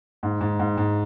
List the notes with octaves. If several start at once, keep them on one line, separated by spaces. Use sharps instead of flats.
G#2
G#2
G#2
G#2